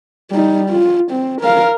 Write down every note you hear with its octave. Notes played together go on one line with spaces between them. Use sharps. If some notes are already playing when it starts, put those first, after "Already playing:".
G3 D#4
F4
C4
A#4 F5